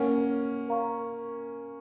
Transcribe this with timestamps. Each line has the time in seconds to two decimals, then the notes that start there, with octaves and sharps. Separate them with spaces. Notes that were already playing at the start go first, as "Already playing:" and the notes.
Already playing: A#3 C#4 A#4 C#5 F#5
0.68 A#4 F5 A#5 C#6